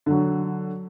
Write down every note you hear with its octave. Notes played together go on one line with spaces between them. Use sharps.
D3 F#3